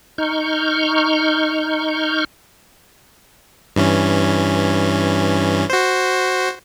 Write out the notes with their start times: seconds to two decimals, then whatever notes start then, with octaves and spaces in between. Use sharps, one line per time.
0.18 D#4 C#6 F6 G6
3.76 G2 E3 C#4
5.70 F#4 C5